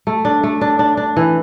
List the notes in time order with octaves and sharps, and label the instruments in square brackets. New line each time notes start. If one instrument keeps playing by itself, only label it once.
[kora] A3
D4
A3
D4
D4
D4
E3